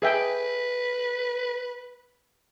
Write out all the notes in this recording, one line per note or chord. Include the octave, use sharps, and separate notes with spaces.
G#4 B4 E5 G5